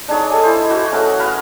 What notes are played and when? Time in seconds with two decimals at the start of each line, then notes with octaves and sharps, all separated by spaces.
0.08 D4 D#4 G#4 C#5
0.29 G#3 A4 G#5 D6
0.43 E4 C5
0.70 F#4
0.92 A3 C#4 G#4 F#5
1.20 A#4 B4 F5